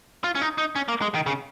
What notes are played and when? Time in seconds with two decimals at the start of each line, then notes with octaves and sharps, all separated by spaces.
0.24 F4
0.35 C#4
0.42 D#4
0.58 D#4
0.76 C#4
0.88 A#3
1.02 G#3
1.15 D#3
1.26 C#3